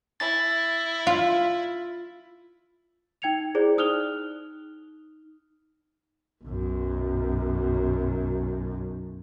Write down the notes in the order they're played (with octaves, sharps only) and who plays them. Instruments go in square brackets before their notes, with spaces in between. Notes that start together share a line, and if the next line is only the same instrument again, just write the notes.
[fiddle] E4 [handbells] A6
[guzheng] F4
[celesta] D#4 G5 G#6 C#7 F7
E4 G#4 C5 D5
D#4 D#6 F6 F#6 F7 G7
[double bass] B1 F#2